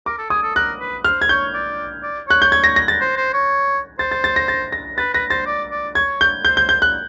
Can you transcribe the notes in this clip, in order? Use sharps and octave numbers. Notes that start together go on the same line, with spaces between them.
A#4 D6
A4
G#4 D#6
A4
A#4 F#6
B4
C5 F6
G#6
C#5 G6
D5
D5
C#5 F#6
G6
G#6
A#6
A#6
A6
C5
C5
C#5
C5 A6
A6
A6
A#6
A6
A#6
B4 A6
B4 A#6
C5 A6
D5
D5
C#5 G#6
G6
C5 G6
G6
G6
F#6